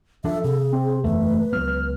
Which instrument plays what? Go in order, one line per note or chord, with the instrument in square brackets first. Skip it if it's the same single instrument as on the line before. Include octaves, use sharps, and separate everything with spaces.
[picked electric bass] F3 D4 [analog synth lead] A4 [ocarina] E5
[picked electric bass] C3 [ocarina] G#4
[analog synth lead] C4
[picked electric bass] F#1 E2 [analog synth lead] A3 [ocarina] B4
[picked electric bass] C#2 F#3 B3 [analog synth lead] F6